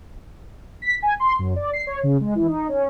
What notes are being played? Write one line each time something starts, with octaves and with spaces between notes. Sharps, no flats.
B6
G#5
C6
F#2
D5
C7
C#5
C#3
G#3
E3
D#4
C#4